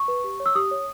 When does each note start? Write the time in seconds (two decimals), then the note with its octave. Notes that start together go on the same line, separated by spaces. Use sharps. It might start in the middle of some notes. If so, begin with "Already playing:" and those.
Already playing: C#6
0.08 B4
0.24 G4
0.40 C#5
0.46 E6
0.55 G4 D#6
0.71 C#5